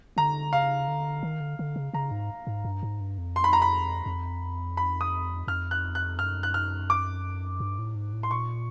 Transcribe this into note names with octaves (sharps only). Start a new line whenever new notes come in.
D3 A#5
C#3 F5
D3
D#3
D3
D3
C#3
C#3 A#5
G#2
G#2
G2
G#2
G2
F2
C6
B5
A#5
B5
F2
B5
D#6
F2 F6
F#6
F#6
F#2 F6
F#6
F6
D6
G2
A2
G#2
A2
C6
A#2 C#6